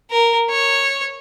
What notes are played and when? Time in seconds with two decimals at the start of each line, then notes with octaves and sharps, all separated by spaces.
0.10 A#4
0.50 C#5